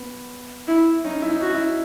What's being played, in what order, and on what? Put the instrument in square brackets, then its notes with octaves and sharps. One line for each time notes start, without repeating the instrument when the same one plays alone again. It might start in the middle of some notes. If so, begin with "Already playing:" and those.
Already playing: [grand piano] B3
[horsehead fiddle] E4
[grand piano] C#4 [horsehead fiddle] D#4
[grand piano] E4
D#4
[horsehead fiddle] F#4
[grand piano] E4